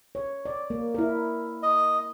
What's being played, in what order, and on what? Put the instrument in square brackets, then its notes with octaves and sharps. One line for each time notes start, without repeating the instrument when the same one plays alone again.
[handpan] C#5
D5
A#3
E4 A#4
[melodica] D#5